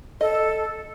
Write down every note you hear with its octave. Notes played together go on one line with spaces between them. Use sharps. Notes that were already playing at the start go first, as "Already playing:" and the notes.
A4 D#5